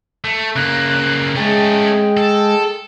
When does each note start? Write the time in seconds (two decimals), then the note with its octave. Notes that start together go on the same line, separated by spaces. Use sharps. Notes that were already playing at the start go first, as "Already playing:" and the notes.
0.24 A3
0.56 C#3 A#3 F#6
1.36 G#3 A3 C#4 G5
2.17 A4